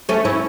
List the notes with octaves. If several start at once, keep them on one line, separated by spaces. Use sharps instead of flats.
A3 C#4
C#4 E4